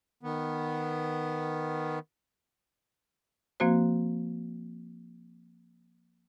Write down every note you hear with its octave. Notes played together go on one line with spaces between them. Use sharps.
D#3 B3
F3 A#3 C4 F#4 C5